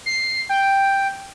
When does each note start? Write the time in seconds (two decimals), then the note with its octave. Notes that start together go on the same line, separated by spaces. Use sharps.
0.06 C7
0.49 G5